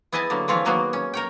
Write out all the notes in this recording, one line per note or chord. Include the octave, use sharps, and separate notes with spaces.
B3 E4 G#4 D#5 G#5 A5
D3 F#3 A#3
E3 F3 C4 F4 C#5
D#3 F#3 A#3 B3 F#4 G#4
C#4
A#4 C#5 G5